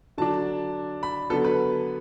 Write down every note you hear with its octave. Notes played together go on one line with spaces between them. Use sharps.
D3 F#3 D4 A5
B5
D3 F#3 B3 A4
B4